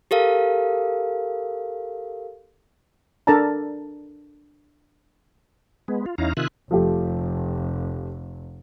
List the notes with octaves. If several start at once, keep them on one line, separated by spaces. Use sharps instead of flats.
G4 A4 A#4 F5
D4 A4 A#4 D5 A5 A#5
G#3 B3
F4
E2 C#4 D#4 E4 F5 A#5
C3 D#3 F4 E5 G#5 F#6
F1 F3 A3 G4